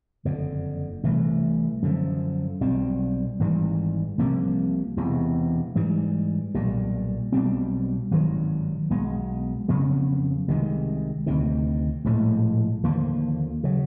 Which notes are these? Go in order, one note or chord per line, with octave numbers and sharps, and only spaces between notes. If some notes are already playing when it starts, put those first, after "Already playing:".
F#1 F2 D3
C2 C3 E3 A3
F#2 D3 F3
B1 B2 G3 C4
G#1 G#2 E3 G3
C2 C3 F3 A#3
E1 E2 C3
G#2 E3 G3
B1 A#2 G3
B1 B2 G3 C4
G#1 G2 D#3 F#3
B1 B2 G#3 B3
F2 C#3 F#3 B3
C2 C3 D#3 G#3
D2 C3 D#3
A#1 A2 F3 G#3
D#2 D3 F3 A#3
C#3 F#3